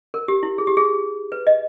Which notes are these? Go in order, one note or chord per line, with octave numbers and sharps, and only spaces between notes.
A#4
G4
E4
G#4
G4
G#4
B4
D#5